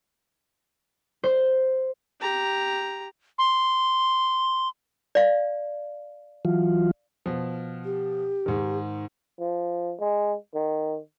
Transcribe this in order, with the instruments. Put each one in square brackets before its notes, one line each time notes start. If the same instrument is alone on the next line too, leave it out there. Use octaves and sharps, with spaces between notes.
[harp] C5
[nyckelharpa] G4 A#5
[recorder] C6
[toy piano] D5 F5
[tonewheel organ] E3 F#3 F4
[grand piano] B2 F3
[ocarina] G4
[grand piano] G#2 D#3
[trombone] F3
G#3
D#3